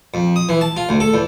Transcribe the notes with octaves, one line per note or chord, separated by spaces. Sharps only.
F2
D#6
E3
A5
F4
D2
A4
E2